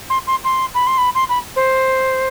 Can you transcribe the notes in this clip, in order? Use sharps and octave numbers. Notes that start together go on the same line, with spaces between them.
C6
C6
C6
B5
C6
B5
C6
B5
C5